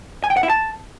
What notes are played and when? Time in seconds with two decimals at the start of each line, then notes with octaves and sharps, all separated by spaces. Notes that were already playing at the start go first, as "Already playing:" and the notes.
0.24 G#5
0.30 G5
0.37 F#5
0.43 E4
0.50 A5